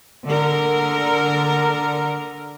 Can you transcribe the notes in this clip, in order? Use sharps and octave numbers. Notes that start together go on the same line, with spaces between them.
D3 A#4